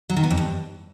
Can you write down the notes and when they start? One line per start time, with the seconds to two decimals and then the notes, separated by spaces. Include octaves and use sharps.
0.10 F#3
0.16 D#3
0.23 B3
0.30 F2
0.37 G2